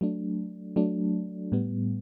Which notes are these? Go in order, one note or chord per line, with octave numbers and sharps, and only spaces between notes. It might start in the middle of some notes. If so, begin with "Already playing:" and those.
F#3 A3 D4
F#3 A3 D4
A2 G3 B3